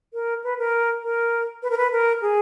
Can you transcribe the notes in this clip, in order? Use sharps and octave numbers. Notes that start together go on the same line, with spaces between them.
A#4
B4
A#4
A#4
B4
A#4
B4
A#4
G#4